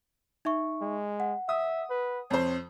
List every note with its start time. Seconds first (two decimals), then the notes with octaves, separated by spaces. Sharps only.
0.45 D#4 E5 C#6
0.81 G#3
1.20 F#5
1.49 E5 D#6
1.90 B4
2.30 F2 C5 C#5